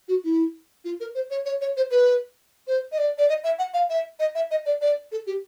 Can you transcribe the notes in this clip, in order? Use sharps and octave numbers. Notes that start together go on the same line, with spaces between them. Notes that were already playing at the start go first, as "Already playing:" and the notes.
F#4
E4
F4
A#4
C5
C#5
C#5
C#5
C5
B4
C5
D#5
D5
D5
D#5
E5
F#5
F5
E5
D#5
E5
D#5
D5
D5
A4
G4